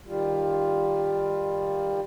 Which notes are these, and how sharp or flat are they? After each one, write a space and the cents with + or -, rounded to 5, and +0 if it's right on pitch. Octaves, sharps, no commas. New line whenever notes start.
D#3 +0 G3 +15 F4 +0